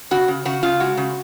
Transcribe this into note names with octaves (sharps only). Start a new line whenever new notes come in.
C#3 F#4
C#3
C#3 F#4
C#3 F4
G#3 F#4
C#3